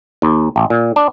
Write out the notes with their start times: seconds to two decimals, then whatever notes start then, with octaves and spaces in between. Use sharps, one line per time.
0.22 D#2
0.56 A1
0.70 A#2
0.96 D4